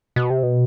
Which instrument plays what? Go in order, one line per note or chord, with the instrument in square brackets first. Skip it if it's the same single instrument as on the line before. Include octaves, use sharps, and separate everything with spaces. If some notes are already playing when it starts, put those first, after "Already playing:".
[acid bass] B2
C3
B2